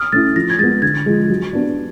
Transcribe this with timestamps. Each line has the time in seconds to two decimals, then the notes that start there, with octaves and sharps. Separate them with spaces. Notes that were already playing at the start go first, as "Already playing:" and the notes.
Already playing: D#6 F6
0.12 A3 C#4 E4 A6
0.36 F3 A#6
0.50 G#6
0.59 G#3 A6
0.63 B3
0.82 D3 G#6
1.06 F3 G#3
1.30 F#3
1.53 B3 D4